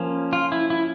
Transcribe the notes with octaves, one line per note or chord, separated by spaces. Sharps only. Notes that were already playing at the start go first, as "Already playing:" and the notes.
Already playing: F3 A#3 C#4
F4
E4
E4